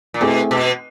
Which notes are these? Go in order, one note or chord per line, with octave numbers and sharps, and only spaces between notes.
A#2
B2 A3 C4 E4 G#4
B2